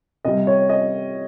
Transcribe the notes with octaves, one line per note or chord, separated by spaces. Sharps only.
C3 G3 D#5
C#5
D#5